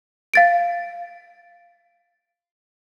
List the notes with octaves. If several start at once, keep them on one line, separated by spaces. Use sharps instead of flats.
F5 A6 D7